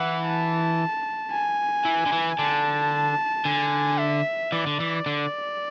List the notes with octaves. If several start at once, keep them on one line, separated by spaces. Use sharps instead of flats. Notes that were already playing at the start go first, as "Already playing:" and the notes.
Already playing: E3 F#5
A5
G#5
E3
D3
E3
D3 A5
D3 G#5
E5
E3 D5
D3
E3
D3